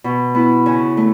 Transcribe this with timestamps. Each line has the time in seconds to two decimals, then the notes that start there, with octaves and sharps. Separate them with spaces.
0.04 B2
0.35 B3 E4
0.66 C#3
0.97 A3